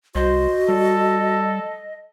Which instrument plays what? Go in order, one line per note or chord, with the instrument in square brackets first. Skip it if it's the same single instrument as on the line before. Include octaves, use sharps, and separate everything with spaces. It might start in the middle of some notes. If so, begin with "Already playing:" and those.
[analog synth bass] C2 [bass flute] F#4 [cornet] C5 [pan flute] D#5
[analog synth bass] G3 [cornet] A4